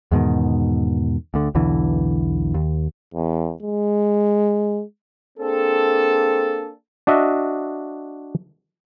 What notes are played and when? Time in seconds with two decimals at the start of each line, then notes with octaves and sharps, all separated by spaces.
0.12 E2 G#2 B2 D#3
1.34 D2 D3
1.55 B1 E2 D3 E3
2.54 D#2
3.14 E2
3.62 G#3
5.39 A#3 C4 D4 G#4 A4
7.07 D4 F#4 D#5 E5